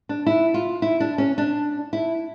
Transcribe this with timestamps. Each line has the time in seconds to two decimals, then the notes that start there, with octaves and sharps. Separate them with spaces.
0.09 D4
0.26 E4
0.54 F4
0.82 E4
1.00 D4
1.18 C#4
1.38 D4
1.93 E4